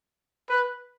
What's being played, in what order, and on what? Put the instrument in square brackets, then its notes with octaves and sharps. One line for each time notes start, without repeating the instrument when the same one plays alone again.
[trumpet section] B4